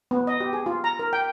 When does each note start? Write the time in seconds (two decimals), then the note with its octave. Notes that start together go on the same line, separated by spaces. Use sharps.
0.11 B3
0.27 D#5
0.40 G4
0.53 G#4
0.66 F4
0.84 A#5
0.99 A#4
1.13 G5